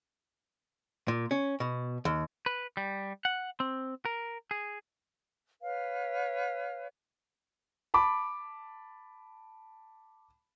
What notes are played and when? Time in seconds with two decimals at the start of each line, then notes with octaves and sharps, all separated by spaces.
1.08 A#2
1.31 C#4
1.60 B2
2.05 D#2
2.46 B4
2.77 G3
3.25 F#5
3.60 C4
4.05 A#4
4.51 G#4
5.62 B4 C#5 F5
7.94 A5 B5 D6